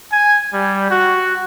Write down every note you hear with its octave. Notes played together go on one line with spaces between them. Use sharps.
G#5
G3
F#4